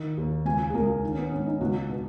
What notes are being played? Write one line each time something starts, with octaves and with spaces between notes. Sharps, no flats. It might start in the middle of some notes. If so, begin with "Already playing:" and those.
Already playing: D#3
D#2
C#2 G#5
G#4
C#2 A#4
D#3
C#4
B3
G#2 C#4
D#4
C#2 F#4
B2